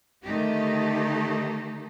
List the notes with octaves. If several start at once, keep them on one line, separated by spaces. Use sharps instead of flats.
D3 D#3 A3 D#4 G4